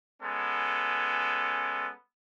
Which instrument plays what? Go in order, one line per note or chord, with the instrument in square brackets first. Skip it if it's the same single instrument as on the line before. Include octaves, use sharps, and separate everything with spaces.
[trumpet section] G#3 B3 C#4 A4